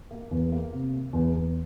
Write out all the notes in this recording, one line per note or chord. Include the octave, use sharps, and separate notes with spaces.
A#3
E2
A#3
C3
A#3
E2
E2